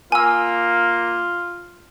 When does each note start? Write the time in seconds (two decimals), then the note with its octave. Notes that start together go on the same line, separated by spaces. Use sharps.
0.12 A#3 F4 G#5 E6